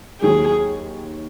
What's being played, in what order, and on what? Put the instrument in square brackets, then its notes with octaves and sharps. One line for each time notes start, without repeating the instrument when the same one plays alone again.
[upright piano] D#2 D#3 F#3 [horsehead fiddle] G#4